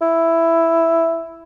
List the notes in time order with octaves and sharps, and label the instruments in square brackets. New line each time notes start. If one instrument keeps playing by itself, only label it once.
[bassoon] E4